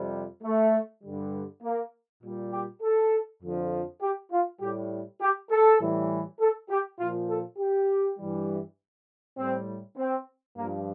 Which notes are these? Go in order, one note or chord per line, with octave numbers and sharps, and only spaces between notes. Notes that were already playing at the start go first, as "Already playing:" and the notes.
Already playing: F2 C3 G3
A3
G2 D3 G3
A#3
A#2 G3
G4
A4
F2 D3 F3
G4
F4
A2 G3 G4
G4
A4
A2 E3 G3
A4
G4
A#2 F3 F4
A4
G4
G2 E3 G3
A2 G3 C4
C4
G2 F3 A#3